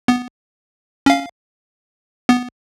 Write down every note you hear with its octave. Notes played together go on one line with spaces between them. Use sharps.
B3
C#4 F5
B3